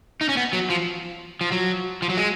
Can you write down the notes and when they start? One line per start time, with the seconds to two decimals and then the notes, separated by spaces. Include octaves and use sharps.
0.21 D#4
0.29 C#4
0.37 B3
0.53 F#3
0.70 F3
1.41 F3
1.52 F#3
2.02 F3
2.10 F#3
2.17 G#3